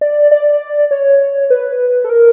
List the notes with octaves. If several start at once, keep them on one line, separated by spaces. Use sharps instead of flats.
D5
D5
C#5
B4
A4
A#4